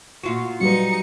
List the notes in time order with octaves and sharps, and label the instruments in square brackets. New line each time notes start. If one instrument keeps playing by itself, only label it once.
[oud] A#2 F4 F#4
[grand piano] F#3 G3 B4 [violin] D#4 C#7